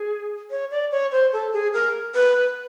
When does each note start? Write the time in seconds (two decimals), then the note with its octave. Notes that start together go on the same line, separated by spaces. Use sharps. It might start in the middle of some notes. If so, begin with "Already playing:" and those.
Already playing: G#4
0.50 C#5
0.71 D5
0.92 C#5
1.12 C5
1.32 A4
1.53 G#4
1.74 A#4
2.15 B4